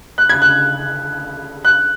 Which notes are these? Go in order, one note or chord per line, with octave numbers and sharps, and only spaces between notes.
F#6
G#6
F#6
F#6